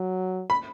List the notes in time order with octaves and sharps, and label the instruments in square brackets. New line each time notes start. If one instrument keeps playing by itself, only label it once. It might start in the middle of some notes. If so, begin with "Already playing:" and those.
Already playing: [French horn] F#3
[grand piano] B5